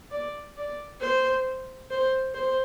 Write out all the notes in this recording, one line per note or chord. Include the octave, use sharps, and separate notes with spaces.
D5
D5
C5
C5
C5